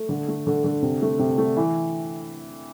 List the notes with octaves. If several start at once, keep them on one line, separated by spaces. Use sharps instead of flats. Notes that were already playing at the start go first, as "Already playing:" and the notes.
Already playing: A3
D3
A3
D3
D3
C3
A3
C3
A3
E3